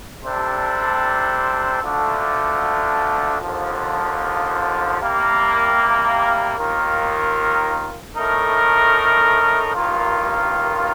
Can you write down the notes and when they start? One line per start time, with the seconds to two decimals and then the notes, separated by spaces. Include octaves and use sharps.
0.24 C3 G3 D4 A4 C5
1.83 D2 D3 F3 A3 D4
3.41 D#2 D3 F3
4.99 C3 G3 A#3
6.58 D#2 D#3 A#3 F4 A#4
8.16 A2 A3 D#4 A#4
9.74 A1 G2 D#3 A#3 F4